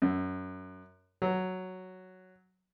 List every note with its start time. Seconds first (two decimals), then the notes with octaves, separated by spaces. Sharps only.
0.02 F#2
1.22 F#3